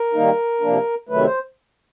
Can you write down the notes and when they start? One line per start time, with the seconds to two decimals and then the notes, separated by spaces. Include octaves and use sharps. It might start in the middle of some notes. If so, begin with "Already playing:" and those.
Already playing: A#4
0.13 D#3 G3 A#3 D#4
0.61 C3 F3 A#3 D4
1.09 C3 D#3 F#3 A3 B4
1.25 C5